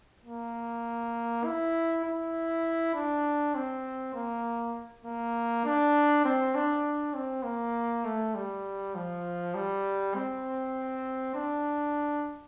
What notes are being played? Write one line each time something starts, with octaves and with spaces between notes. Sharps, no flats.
A#3
E4
E4
D4
C4
A#3
A#3
D4
C4
D4
C4
A#3
A3
G3
F3
G3
C4
D4